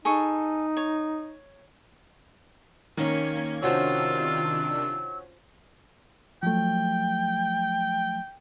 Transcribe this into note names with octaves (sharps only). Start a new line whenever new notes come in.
D#4 G#4 A4 C#6
C#5
D#3 A#3 C#4 G#6
C3 D#3 C#4 D4 F4 F#4 C5 E6
F3 F#3 A3 G5